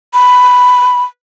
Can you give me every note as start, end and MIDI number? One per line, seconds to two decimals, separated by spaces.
0.14 1.03 83